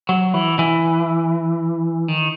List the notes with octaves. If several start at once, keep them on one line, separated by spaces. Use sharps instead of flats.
F#3
E3
E3
D#3